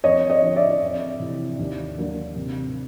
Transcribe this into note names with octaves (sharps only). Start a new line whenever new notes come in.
F2 C#5 D#5
C#5 D#5
D3 F3
D5 E5
F2
C3 E3
D#2
D3 F#3 A#3 D4
C3